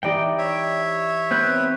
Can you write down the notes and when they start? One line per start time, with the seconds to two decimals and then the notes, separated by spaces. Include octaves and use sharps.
0.03 E3 D#4 G4 D5 G5
0.38 C#5 E5
1.31 B3 C4 B4 F#6 G6